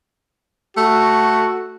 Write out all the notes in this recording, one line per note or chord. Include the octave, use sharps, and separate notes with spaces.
A3 F#4